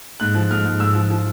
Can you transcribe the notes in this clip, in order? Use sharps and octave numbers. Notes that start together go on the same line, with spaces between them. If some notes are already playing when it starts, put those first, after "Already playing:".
G#2 F#6
F3
G#2 F6
G#2
G#2 E6
F3
F3